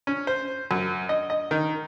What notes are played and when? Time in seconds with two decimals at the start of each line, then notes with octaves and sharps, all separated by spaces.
0.07 C#4
0.27 C5
0.71 F#2
1.09 D#5
1.30 D#5
1.51 D#3